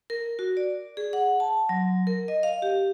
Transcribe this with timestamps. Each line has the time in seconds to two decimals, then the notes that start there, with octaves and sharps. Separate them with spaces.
0.10 A#4
0.39 F#4
0.57 D5
0.97 G#4
1.13 F#5
1.40 A5
1.69 F#3
2.07 A#4
2.28 D#5
2.43 F5
2.62 G4